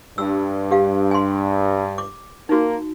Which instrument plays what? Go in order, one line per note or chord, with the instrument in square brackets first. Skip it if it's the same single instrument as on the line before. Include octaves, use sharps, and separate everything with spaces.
[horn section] G2 [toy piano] E6
[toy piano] G4 F5
G#5 C6
D6
[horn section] A#3 [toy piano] D#4 F#4